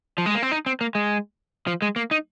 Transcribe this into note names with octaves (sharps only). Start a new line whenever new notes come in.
F3
G#3
A#3
C4
D#4
C4
A#3
G#3
F3
G#3
A#3
D#4